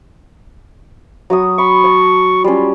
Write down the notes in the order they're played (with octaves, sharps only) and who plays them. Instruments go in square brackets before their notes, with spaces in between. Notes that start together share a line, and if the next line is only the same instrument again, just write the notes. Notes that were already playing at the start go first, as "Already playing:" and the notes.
[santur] F#3 C#6 D#6
[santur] B5 [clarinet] C#6
[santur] C#5 A5
[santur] G3 C#4 [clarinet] F4